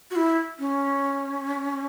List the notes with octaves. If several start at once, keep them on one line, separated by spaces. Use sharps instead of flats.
F#4
E4
C#4